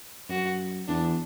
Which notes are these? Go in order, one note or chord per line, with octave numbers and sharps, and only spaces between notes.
F#2 F#4
E2 D4